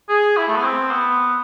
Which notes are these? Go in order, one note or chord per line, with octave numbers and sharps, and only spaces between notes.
G#4
E4
A3
B3
C4
B3